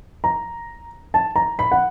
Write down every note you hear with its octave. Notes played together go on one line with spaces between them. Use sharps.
A#5
A5
A#5
B5
F#5